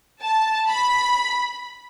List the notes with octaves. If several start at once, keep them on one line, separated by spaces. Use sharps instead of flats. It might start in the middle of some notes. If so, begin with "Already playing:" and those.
A5
B5